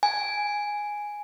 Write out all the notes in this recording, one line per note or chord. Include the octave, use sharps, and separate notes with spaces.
G#5